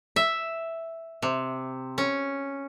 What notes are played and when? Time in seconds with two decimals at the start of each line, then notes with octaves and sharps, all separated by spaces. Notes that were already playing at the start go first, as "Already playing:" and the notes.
0.16 E5
1.22 C3
1.98 C#4